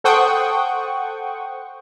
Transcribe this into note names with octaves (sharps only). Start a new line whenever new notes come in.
A4 C5 F#5 G5 C#6 D#6